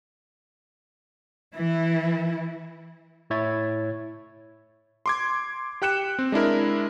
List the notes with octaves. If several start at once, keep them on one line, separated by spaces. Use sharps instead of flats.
E3 E4
A2 E4 C#5 E5 G#6 A6
C6 D6 G#6
G4 G5 F#6 C#7 E7
C4
G#3 D4 E4 A#4